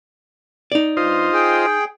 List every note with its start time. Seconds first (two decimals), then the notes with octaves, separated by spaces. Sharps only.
0.72 D#4 D5
0.97 G2 F4 C5 D#5
1.33 G#4 G5